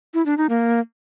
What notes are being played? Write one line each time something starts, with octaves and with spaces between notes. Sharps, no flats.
E4
D4
D#4
A#3